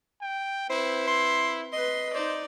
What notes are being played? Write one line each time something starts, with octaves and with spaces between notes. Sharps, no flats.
G5
C4 E4 B4 C5
C6
B4 D#5 C6
D#4 C5 D5